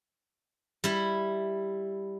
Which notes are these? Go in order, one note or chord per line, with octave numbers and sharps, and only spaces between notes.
G3 E4